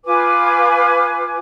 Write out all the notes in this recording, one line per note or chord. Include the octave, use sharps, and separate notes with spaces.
F4 B4 G#5 D6